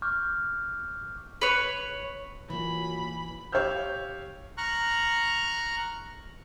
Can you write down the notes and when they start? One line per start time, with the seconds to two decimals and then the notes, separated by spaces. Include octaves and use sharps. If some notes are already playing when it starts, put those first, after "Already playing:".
0.02 C#6 D6 F6 G6
1.41 B4 C#5
2.50 A#2 E3 F#3 B5
3.52 G4 C#5 F5 E6 F6 G6
4.58 A#5 C#6 F6 F#6